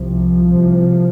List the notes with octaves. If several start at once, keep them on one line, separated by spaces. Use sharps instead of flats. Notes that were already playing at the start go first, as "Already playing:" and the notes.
Already playing: C2 C3 F3
C2 C3